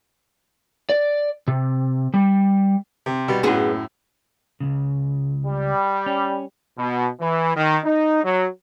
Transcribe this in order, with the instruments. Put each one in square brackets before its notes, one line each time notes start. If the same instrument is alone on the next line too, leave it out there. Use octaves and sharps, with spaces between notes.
[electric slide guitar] D5
C3
G3
[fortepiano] C3
B2 G3
[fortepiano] F#2 A2 [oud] B3 F#4 G#4
[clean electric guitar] C#2 F#2 C#3
[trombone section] G3
[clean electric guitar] C#4
[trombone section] B2
E3
D#3
D#4
F#3